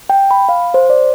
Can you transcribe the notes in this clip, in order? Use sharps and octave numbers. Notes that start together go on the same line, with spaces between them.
G5
B5
F5
C5
D5